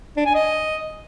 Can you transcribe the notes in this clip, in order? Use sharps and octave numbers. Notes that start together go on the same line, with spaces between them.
D4
G#5
D#5